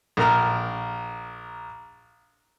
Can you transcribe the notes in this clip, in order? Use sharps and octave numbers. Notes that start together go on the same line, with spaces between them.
A#1 A#4 A#5 F6